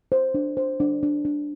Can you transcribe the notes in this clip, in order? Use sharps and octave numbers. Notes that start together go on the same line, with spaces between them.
C5
D4
C5
D4
D4
D4